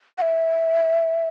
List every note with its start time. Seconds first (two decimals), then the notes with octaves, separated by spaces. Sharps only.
0.18 F#5
0.22 E5